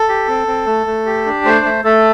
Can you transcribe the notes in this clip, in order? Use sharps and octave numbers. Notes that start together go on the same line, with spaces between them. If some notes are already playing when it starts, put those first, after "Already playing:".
Already playing: A4
G4
C4
C4
A3
A3
G4
D4
A3 C5
A3
A3 A4